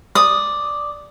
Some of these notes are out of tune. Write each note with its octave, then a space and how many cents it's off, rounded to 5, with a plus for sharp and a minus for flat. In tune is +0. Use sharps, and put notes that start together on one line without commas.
D5 +0 D#6 -10